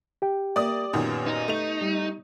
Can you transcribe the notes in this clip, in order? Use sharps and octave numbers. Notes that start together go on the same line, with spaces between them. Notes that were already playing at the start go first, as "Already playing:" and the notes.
G4 G5
A#3 D5 E5 D#6
F#2 A#2 D#3 B3
D#4
A3 F7
G3